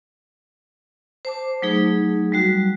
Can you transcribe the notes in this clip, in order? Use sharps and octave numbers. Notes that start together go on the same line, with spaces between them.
C5 A5 D6
F#3 A3 D#4 G#4
F#3 G3 F#4